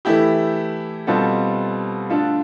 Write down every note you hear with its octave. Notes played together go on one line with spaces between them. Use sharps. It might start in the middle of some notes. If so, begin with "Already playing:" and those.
E3 A3 E4 G4
B2 G3 C4 F4 A4
D3 A3 D4 F4 A4